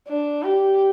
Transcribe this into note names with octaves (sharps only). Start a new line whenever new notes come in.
D4
G4